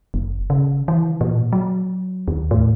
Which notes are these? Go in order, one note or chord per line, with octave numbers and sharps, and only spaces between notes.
F#1
C#3
E3
A#2
F#3
D#2
A2